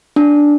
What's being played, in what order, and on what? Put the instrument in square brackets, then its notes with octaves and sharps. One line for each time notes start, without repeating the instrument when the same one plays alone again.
[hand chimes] D4